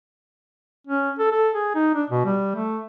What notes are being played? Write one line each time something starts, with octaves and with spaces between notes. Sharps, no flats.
C#4
A4
A4
G#4
D#4
D4
B2
G3
A3